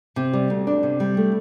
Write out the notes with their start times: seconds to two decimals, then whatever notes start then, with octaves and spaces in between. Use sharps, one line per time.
0.16 C3
0.33 G3
0.50 D2
0.67 D4
0.83 C3
1.00 G3
1.17 A3